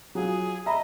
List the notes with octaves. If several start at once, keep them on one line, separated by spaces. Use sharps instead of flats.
F#3 F4 G#4
D#5 E5 A#5 B5